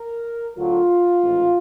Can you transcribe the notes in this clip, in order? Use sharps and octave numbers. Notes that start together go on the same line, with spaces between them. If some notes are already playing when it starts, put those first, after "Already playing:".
Already playing: A#4
D2 D3 F#3 F4
A1 G#2 D#3